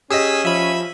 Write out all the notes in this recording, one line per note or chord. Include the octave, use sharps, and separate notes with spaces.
C#4 G4 G#4 D#5 E6 B6
F3 E5 B5